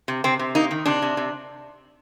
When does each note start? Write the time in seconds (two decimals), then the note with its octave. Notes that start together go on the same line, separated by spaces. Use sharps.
0.08 C3
0.24 C3 C4
0.39 C3
0.55 A#3 D#4
0.71 D#3
0.86 C3 D4
1.02 C3
1.17 C3